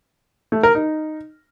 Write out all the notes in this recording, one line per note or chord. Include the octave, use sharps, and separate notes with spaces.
A3
A#4
D#4